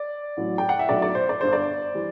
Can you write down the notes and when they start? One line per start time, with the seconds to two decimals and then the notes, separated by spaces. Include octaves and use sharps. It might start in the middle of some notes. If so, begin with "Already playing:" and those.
Already playing: D5
0.37 A1 A2 F#3
0.58 G5
0.69 F#5
0.79 E5
0.89 B1 A2 F#3 D5
1.02 D5
1.15 C5
1.29 D5
1.41 G1 G2 D3 C5
1.53 D5
1.95 E3 G3